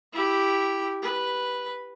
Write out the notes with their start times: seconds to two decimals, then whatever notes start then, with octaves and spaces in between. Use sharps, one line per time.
0.13 E4 G4
1.02 B4